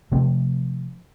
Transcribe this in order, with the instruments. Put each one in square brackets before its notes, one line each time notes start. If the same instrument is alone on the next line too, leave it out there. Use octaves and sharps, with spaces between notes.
[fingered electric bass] C3 F3 A3 C4